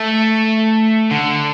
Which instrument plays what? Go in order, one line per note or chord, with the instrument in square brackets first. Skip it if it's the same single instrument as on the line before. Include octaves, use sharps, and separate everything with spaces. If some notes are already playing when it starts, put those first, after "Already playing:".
Already playing: [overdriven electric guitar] A3
D3